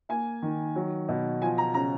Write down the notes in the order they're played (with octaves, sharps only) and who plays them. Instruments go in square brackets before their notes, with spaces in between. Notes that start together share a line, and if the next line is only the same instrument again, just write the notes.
[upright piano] A#3 G#5
D#3
F#3
B2
F3 G#5
A#5
C#3 A#5